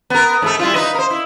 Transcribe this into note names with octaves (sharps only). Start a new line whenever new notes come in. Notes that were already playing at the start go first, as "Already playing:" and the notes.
B3 A#4
G#2 A3 A4
G3 E4 F4
D#4 B4 D#5
A#4 C5
E4